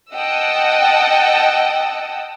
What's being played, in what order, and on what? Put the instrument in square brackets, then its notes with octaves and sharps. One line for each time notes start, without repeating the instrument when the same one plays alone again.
[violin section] D#5 F#5 G5 A5 D#6 E6